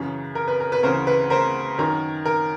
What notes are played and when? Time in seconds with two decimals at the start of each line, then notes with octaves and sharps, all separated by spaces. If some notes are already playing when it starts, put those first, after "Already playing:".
Already playing: F#2 C#3 E3
0.35 A#4
0.48 B4
0.60 A#4
0.72 B4
0.83 D2 C#3 E3 A#4 C5
1.07 B4
1.30 A#4 C5
1.78 F#2 D#3 A#4
2.26 A#4